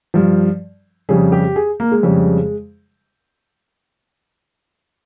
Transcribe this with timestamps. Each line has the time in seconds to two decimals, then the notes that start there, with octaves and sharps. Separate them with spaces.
0.14 G2 F3
1.09 F2 C#3 G3 G#4
1.32 G4
1.56 G#4
1.80 A#3
1.92 G#3
2.03 F2 C#3 G3